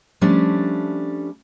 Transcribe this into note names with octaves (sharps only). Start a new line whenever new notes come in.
F3 G3 A3 C#4 D4